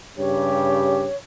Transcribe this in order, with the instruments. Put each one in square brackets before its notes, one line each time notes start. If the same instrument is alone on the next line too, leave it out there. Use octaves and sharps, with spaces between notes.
[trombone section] G2 C#3 G4 [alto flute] C#5